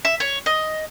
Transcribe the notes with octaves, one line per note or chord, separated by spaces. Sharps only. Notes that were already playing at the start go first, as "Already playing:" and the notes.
E5
C#5
D#5